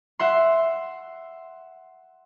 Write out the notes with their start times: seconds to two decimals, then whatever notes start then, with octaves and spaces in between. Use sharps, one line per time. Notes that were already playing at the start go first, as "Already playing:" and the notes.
0.19 E5 F#5 C6